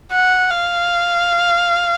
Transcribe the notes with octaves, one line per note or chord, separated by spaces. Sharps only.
F#5
F5